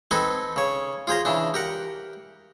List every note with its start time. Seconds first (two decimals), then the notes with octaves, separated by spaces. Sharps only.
0.11 C4 D#4 A4 B4 G#5
0.56 C#3 C#5
1.07 F4 G#4 C5 A#5
1.25 C#3 E3 D4
1.54 G4 A#4 F#5